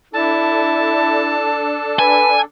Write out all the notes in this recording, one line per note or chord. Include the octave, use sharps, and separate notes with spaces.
D4 E4 A4 A5
B4 G#5